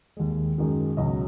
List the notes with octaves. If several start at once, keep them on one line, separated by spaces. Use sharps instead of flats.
D#2 D#3 G#3
F#2 D#3 G#3
C#2 B2 F#3 D#5